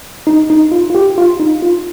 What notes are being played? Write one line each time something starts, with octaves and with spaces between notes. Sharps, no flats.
D#4
D#4
F4
F4
G4
F4
D#4
F4